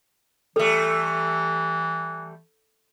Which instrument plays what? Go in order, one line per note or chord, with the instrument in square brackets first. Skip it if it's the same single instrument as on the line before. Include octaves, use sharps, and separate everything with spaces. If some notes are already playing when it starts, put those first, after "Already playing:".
[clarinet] E3 [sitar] G3 A3 [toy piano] A4